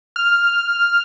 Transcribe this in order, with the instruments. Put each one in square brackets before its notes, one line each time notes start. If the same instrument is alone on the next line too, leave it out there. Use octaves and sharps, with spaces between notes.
[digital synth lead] F6